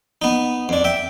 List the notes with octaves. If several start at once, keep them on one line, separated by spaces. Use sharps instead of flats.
B3 D#4
F2 D4
E5 G5